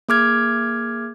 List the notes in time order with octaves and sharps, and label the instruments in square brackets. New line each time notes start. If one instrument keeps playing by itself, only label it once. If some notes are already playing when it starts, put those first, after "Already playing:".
[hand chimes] A#3 G#4 D6 F6 G#6